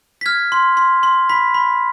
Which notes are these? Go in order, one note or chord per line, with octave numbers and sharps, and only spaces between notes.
B6
F6 G#6
C6
C6
C6
B5 B6
B5